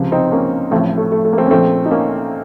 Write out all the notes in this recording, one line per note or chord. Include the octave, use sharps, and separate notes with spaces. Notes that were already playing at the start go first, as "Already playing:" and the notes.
Already playing: C#2 C3 F3
C4 D#4
A#3 C#4
A1 A2 F3 A3 C4
A3
A3
A3
A#3
A3 C4
C#4
A#1 A#2 F3 A3 C4
D#4
A#3 C#4